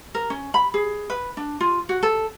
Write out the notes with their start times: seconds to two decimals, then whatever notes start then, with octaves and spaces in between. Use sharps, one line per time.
0.15 A#4
0.30 C#4
0.54 B5
0.74 G#4
1.10 B4
1.37 D4
1.61 F4
1.89 F#4
2.03 A4